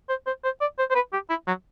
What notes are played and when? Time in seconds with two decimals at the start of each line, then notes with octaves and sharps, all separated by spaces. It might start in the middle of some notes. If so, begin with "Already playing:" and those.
0.09 C5
0.27 C5
0.44 C5
0.61 D5
0.79 C5
0.90 C5
0.95 B4
1.13 G4
1.30 E4
1.47 F#3